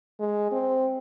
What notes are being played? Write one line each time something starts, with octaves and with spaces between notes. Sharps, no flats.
G#3
C4